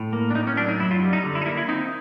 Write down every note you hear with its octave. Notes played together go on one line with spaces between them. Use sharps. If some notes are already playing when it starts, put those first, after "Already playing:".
Already playing: A2
A#3
D4
A2 D#4
C#4
F#3 D4
D#4
F#2 E4
F4
G3
D#4
D3
E4
D#4
A#3 E4
E4
C4 D#4